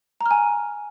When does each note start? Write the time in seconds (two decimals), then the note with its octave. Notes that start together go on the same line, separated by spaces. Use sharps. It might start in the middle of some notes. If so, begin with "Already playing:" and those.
0.21 A#5
0.26 F6
0.31 G#5